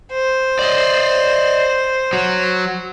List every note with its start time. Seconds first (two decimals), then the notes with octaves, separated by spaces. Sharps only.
0.12 C5
0.59 D5 D#5
2.13 F#3